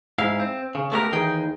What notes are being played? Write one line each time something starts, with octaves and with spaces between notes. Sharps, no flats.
G#2 E4 F5
C4
C#3
A3 B3 E4 G4 A#4
D#2 E3 D#4 G#4 G5